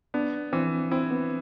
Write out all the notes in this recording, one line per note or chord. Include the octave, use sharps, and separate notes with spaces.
B3 D4
E3 C4
C4 E4
B3